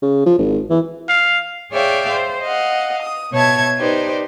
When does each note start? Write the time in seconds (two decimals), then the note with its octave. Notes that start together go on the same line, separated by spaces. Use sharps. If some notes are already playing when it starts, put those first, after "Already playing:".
0.02 C#3
0.26 F3
0.39 G#1
0.70 E3
1.09 F5
1.73 G#4 C#5 D5 E5 F5 G5
2.11 C5
2.42 D#5 F5 F#5
3.02 D#6
3.34 B2 C#5 E5 A5 G#6
3.79 D#4 G4 B4 C5 D5